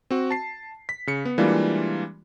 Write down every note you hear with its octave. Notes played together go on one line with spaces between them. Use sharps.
C4 F#4
A5 C7
B6
C#3 C#7
B3
E3 G3 G#3 A#3 D4 F4